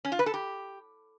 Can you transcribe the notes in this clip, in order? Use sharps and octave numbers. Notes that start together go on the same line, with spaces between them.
C#4
F4
B4
A4
G4